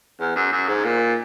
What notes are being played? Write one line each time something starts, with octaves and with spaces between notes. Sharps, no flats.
E2
F#2
F#2
G#2
A#2